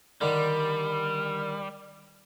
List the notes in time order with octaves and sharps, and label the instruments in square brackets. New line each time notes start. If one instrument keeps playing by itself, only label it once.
[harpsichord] D3 D#3 D4 [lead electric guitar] G3